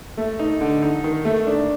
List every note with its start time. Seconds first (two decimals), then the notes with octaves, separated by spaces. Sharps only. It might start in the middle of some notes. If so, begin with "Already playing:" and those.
0.17 A3
0.39 D#4
0.61 D3
0.82 D#4
1.04 D#3
1.25 A3
1.47 D4